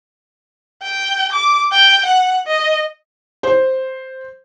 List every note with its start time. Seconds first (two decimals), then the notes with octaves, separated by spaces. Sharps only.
0.82 G5
1.32 D6
1.72 G5
2.06 F#5
2.47 D#5
3.43 C5